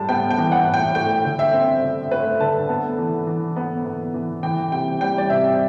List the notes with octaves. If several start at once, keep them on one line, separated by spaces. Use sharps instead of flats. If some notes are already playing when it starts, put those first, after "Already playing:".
Already playing: A2 G3 A5
B3 G5
G5
E3
F#5
A2
G5
A3 G5
D3
E5
C4
D3
A3 B4
D3 A5
B3
E3
E3
B3
B3
E3
E3 G5
C3 G5
G3 G5
D5
C3 E5